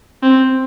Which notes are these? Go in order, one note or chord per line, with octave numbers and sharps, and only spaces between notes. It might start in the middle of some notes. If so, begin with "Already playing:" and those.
C4